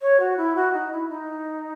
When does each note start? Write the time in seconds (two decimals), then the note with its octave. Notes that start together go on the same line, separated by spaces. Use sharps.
0.02 C#5
0.20 F#4
0.37 E4
0.56 F#4
0.73 D#4
0.92 E4
1.09 D#4